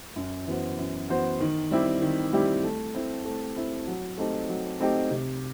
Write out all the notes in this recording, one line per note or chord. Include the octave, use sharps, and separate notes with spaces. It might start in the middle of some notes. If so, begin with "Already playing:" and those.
F#2
E3 B3 F#4 C5
F#2
E3 B3 F#4 C5
D#3
G3 C4 E4 G4
D#3
G3 C4 E4 G4
A3
C4 E4
A3
C4 E4
F#3
A3 C4 D#4 G4
F#3
A3 C4 D#4 G4
C3